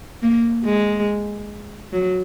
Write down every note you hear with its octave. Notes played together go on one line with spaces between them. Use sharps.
A#3
G#3
F#3